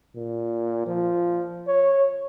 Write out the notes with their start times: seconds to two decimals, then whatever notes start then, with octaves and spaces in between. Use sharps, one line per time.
0.16 A#2
0.87 F3
1.68 C#5